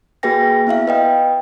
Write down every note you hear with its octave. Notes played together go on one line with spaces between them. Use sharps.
A#3 F#4 G#4 B4 G5 A#6
B3 E4 E5 F5
B4 D#5 G5